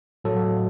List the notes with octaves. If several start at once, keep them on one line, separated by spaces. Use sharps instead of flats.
A2 F#3 A4